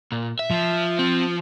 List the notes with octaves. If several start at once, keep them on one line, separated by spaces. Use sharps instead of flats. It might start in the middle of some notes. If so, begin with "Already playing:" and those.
A#2
E5
F3
C4